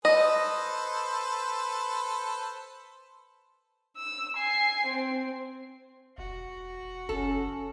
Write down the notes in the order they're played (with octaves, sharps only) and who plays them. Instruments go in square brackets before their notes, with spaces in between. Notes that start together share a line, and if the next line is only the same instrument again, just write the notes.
[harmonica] A4 B4 C5 [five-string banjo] D#5
[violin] E6
G#5 C7
C4
[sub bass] E1 [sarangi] F#4
[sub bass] F#1 [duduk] C#4 [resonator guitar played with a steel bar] A4